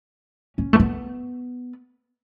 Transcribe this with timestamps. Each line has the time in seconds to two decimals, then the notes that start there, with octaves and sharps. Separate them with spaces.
0.58 C#4
0.73 A3
0.80 B3